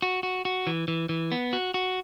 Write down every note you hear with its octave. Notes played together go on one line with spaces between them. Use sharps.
F#4
F#4
F#4
E3
E3
E3
B3
F#4
F#4